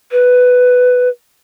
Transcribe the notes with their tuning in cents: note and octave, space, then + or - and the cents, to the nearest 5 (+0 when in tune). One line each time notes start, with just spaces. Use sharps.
B4 +10